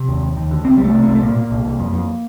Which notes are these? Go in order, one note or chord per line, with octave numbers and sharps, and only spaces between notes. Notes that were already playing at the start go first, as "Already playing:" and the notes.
Already playing: C3
D#2
D#2
D#2
D3
C2 C4
C2 G3
A3
C3
A3
C2
A3
A#2 A#3
A#2
C2
C2
F2
F2